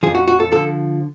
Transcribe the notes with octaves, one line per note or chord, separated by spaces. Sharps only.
F2 F3 G#4
F#4
F#4
A4
D3 F3 A4